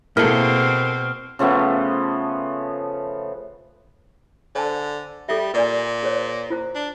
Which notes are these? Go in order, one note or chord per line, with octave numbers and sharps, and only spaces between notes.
B2 A#3 C4 E4 G#4 A4 F6
C#3 F3 A3 B3
D3 C5 G#5 A5
G3 G#4 A4 E5
A#2 B4 D5 G#5
G#4 C5 C#5
F4 C5 A#5
D4